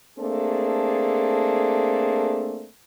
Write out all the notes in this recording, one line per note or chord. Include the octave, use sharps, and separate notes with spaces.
A3 A#3 C4 D4 G#4 A4